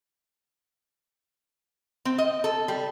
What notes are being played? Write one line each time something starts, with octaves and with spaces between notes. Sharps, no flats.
C4
D#5
A4
G3